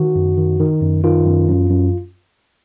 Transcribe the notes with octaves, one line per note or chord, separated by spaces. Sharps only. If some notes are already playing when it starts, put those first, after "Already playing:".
Already playing: D#3 F#4
F#2
D#3
D#3
F#2
D#3 F4
F#2
F#2
F#2